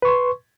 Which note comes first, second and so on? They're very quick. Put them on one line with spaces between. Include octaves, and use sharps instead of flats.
B4 C#6 C6